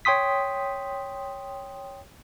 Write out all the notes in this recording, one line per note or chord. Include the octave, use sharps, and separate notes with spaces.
C#5 G5 C6 D#6 B6